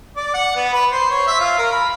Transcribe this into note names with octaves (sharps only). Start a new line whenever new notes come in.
D5
F#5
B3
B4
C5
C#5
E5
F4
A#4
B5